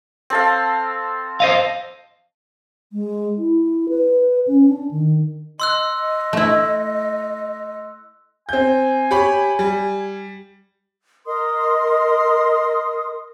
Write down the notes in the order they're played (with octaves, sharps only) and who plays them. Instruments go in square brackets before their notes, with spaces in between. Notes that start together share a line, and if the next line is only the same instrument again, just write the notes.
[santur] C4 A4 F5
[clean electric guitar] C5 D#5 F5
[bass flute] G#3
E4
B4
C#4
D4
D#3
[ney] D#5 [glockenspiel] C6 E6 F#6
[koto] A3 E4
[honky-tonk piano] C4 G6 [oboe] G#5
[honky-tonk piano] G4 C#5 B5
G3
[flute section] A#4 D#5 C6 D#6